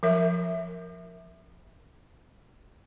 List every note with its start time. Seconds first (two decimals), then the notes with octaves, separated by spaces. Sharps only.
0.03 F3 A#4 E5